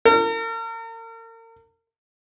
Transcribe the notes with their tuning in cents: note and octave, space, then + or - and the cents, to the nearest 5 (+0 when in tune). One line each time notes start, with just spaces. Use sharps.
A#4 -40